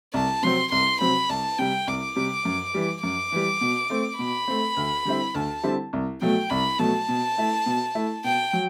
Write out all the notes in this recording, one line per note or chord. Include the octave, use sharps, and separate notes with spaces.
C2 A5
C3 F#3 C4 C6
C2 C6
C3 F#3 C4 B5
C2 A5
C3 G3 G5
C2 D6
C3 G3
F#2
E3 G3
F#2 D6
E3 G3
B2
A3 C4
B2 B5
A3 C4
D2
D3 G3 C4 E4
D2 A5
D3 G3 C4 E4
C2
B2 F#3 A3 G5
C2 B5
B2 F#3 A3 A5
B2
A3 E4
B2
A3 E4
B2 G5
F#3